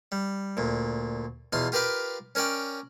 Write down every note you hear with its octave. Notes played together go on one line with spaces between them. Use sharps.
G3
D2 A#2
E2 B2 F4 C6
F4 G4 A#4 B4 F5 G5
C#4 A#4 C#5 D5 G5